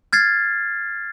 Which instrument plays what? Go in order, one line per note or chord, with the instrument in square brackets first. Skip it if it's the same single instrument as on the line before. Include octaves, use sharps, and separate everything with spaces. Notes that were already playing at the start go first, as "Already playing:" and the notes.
[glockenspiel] F6 G#6 A6 C7